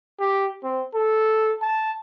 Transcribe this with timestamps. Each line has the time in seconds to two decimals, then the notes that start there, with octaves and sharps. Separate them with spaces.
0.20 G4
0.63 C4
0.94 A4
1.62 A5